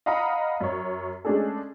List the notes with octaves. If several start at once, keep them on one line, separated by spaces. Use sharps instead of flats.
D#5 F5 F#5 A#5 B5 D#6
F#2 C#5
G#3 A3 C#4 D4 G#4 A4